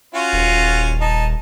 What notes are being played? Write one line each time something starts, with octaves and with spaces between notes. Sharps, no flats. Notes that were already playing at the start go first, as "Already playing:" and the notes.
C#4 F4 F#4
D#1
D#4 A5